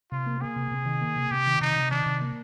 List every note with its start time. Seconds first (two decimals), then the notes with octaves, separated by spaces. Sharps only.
0.12 C3 F4
0.26 A#3
0.41 A#3 G#4
0.56 C3
0.71 C3
0.86 D#3
1.01 A#3
1.16 C3
1.31 C3 G4
1.47 D#3
1.61 C3 D#4
1.76 C3
1.91 D#3 D4
2.06 C3
2.21 A#3